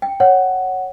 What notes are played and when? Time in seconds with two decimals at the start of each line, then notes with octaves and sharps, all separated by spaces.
0.02 G5
0.20 C#5 F#5